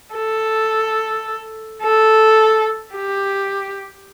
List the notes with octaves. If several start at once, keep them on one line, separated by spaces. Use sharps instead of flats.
A4
A4
G4